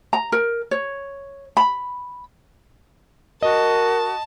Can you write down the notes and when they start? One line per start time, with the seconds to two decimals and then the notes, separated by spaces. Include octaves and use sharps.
0.13 A#5
0.32 A#4
0.71 C#5
1.57 B5
3.43 F#4 A#4 D#5 A5